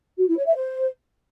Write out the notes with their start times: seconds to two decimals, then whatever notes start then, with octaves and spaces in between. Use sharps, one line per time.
0.18 F#4
0.28 E4
0.37 C#5
0.46 E5
0.56 C5